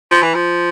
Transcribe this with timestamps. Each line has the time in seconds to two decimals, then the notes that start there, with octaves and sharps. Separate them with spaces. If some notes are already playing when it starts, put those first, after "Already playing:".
0.11 F3
0.22 E3
0.34 F3